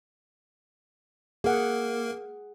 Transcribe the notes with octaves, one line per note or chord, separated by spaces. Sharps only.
A#3 G#4 A#4 F#5